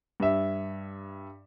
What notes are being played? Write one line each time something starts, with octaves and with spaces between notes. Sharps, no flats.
G2 E5